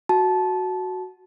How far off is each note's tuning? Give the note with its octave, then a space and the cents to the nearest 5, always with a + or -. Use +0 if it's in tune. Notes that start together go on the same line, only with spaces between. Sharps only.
F#4 +0 A5 -20